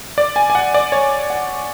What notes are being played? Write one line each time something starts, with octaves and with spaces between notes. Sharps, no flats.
D5
G#5
G#5
F#5
D5
C#5
F#5